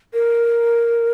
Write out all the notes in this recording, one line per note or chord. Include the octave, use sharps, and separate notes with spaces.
A#4